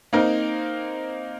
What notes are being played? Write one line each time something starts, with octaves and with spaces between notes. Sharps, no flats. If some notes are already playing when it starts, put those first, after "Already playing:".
A#3 C4 D#4 A#4